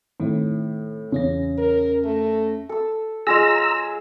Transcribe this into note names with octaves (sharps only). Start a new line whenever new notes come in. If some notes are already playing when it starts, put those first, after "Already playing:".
A2 D#3 C4
E2 C#3 C#4 A#6
A#4
A3
A4 E6
G#3 F4 G#4 A#5 E6